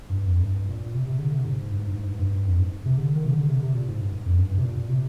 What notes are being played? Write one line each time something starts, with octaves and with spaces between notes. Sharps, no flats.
G2
F2
G2
A#2
C3
C3
D3
C3
G#2
G2
G#2
G2
G#2
G2
G#2
G2
F2
G#2
C3
D3
D#3
C3
D3
C3
C3
A#2
G#2
G2
F2
G2
G2
C3
A#2
A#2
C3